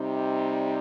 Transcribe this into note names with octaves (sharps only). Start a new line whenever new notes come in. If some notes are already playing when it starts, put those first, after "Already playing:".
Already playing: C3 G3 C4 D#4
D#5
D5